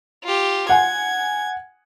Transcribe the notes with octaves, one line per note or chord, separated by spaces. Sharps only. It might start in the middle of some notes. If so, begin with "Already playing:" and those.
F4 G4
F#5 G#5 G#6